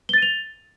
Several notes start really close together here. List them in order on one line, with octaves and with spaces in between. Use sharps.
G7 A6 D#7 F7